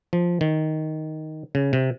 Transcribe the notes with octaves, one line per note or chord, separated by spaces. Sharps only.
F3
D#3
C#3
C3